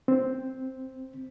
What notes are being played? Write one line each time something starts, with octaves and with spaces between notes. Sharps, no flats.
C4